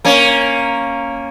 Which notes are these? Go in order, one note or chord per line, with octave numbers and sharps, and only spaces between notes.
A#3 C#4